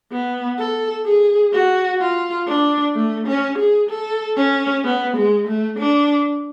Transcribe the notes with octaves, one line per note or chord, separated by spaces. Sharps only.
B3
A4
G#4
F#4
F4
D4
A3
C#4
G#4
A4
C#4
B3
G#3
A3
D4